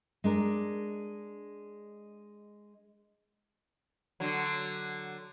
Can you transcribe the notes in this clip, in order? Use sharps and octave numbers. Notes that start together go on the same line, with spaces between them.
G#3 D4 A#4
D3 F#3